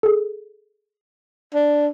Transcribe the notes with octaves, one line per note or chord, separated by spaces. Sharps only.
G#4 A4
D4